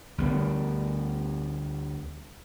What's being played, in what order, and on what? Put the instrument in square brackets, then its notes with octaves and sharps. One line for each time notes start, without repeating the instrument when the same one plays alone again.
[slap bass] D2 G3 B3